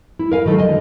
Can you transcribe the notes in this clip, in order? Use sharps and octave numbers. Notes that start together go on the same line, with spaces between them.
E4
A#4 F5 G#5
D#3 F#3 A3
D3 D#5 G#5